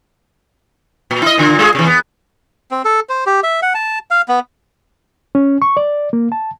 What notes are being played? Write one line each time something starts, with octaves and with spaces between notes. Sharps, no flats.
A#2
E4 D#5
A#2 D3 F4
G#3 F4 G#4
C3 E3
B3
C4
A4
C5
G4
E5
F#5
A5
F5
B3
C#4
C#6
D5
A#3
A5